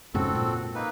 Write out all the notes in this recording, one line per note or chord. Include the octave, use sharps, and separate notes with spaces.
F2 G#2 C#3 C4 F#4 A4
A#2
A#3 D#4 B4